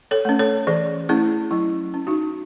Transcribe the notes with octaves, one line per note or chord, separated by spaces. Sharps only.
A4 C#5
A3 C#4
A4 C#5
E3 G#4 C5
A3 C#4 E4 G#4
F#3 E4
C#4
D#4 F#4